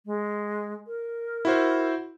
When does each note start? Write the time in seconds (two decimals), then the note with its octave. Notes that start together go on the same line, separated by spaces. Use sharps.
0.06 G#3
0.87 A#4
1.45 E4 F#4 C5